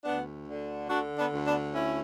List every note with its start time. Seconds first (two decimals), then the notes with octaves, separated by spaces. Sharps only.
0.05 D2 B3 D4
0.48 D3
0.89 D3 D4 F#4
1.18 B3 D4
1.32 D2
1.46 B3 D4
1.74 D2 C#4 E4